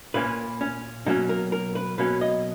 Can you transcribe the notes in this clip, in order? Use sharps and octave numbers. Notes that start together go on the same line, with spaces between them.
A#2 A#3 C#4 B4
C#4
B2 F#3 A#3 C#4 D#4
A#4
A#4
B4
B2 F#3 A#3 C#4 B4
D#5